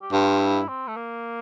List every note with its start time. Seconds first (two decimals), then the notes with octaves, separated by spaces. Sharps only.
0.02 G4
0.12 G2 F4
0.40 E4
0.68 C4
0.87 A3
0.96 A#3